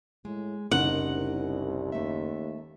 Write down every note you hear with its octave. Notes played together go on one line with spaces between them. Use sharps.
A2 G#3
F#1 C2 D#4 A#4 F#5
D#2 A3 E5